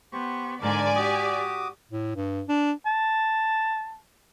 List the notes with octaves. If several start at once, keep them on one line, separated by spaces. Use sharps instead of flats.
B3 G4 C5 C#6
G#2 D3 A#4 D5 G#5 A5 D6
F#4 G4 D6 D#6
A2
G2
D4
A5